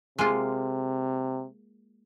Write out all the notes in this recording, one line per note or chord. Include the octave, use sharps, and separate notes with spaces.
C3 G#3 A#3 F4